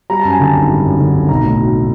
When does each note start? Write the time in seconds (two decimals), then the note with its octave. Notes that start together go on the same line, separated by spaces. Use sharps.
0.10 G3 A#5
0.20 F#2 A5
0.30 G#5
0.40 D3 A5
0.55 G#1
0.69 G3
0.84 F#2
1.00 D3
1.15 G#1
1.29 B1 A#5
1.44 A2
1.60 F#3